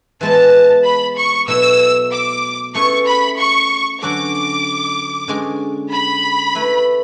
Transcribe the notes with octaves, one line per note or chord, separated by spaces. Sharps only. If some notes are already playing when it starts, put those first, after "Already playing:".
E3 G#3 B3 E4 A5
B5
C#6
B2 F#3 A3 E4 E6
D6
A3 C#4 E4 G#4 B4 C#6
B5
C#6
D3 F#3 C#4 F#4 A4 D6
D3 G#3 C#4 G#4
B5
A3 E4 B4